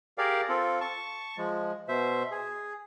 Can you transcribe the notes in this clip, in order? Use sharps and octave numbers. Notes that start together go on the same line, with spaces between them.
G4 G#4 A#4 D5 F5
C4 F4 A4
A5 C#6
F3 G#3
B2 C5 E5
G#4